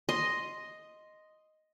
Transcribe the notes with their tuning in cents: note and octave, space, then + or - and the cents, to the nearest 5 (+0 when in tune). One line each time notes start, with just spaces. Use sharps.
D#5 +0 C6 +0